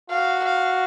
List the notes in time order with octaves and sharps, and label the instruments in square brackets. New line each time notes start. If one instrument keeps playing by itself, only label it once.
[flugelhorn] F#4 [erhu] F5
[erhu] F5